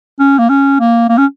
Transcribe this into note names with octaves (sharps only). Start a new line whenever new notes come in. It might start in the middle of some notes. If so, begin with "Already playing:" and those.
C#4
A#3
C#4
A#3
A#3
C#4